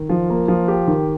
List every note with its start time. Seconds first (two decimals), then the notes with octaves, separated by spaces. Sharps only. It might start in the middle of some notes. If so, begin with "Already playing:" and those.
Already playing: D#3
0.10 F3
0.29 A#3
0.48 F3
0.68 G4
0.87 D#3